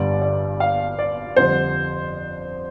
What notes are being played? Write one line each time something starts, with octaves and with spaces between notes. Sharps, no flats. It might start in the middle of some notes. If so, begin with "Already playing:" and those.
Already playing: G1 G2 D3 G3 D5
D5
F5
D5
F2 D3 G3 C5